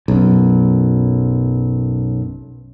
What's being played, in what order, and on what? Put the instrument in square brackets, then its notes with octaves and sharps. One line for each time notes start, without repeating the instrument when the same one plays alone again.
[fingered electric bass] B1 F#2